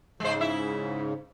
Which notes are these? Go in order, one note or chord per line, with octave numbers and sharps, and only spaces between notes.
G#2 C#3 G#3 C5
E4 E5